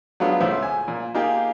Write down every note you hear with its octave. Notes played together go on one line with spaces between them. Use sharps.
F#3 G#3 A3 B3 D4 F4
C#2 A2 E4 C5
G#5
A#2
A#3 D#4 F4 G4 G#4